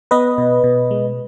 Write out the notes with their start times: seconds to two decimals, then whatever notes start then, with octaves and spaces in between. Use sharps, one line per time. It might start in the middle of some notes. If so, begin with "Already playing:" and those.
0.11 B3 B4 D#5
0.38 B2
0.64 B2
0.91 G#3